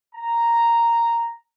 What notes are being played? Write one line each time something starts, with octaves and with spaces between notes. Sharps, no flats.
A#5